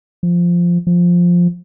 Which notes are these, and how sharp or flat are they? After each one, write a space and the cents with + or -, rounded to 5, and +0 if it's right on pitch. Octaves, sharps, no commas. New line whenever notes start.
F3 -5
F3 +5